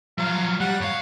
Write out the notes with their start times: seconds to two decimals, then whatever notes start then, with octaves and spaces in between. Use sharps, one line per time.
0.18 F3 F#3 F5
0.60 G3 F#5
0.81 G2 C#5 F5